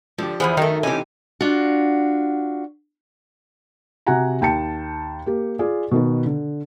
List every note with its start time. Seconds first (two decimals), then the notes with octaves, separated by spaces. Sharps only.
0.18 D3 F3 G4
0.40 E2 E3 F3 G#4 F#5
0.57 F#2 D#3 A3 D#4
0.83 C3 E3 C#4 D#4 G4 G#5
1.41 D4 F4 F#4
4.07 C3 F#4 G4 F#5 G#5 A#5
4.41 D#2 G5 A5 C#7
5.26 A#3 G4
5.59 F4 G#4 D5 G#5
5.91 B2 D#3 B4
6.26 D3